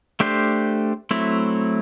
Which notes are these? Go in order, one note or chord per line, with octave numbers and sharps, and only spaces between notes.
A3 D4 G4 C5
F#3 A3 C4 E4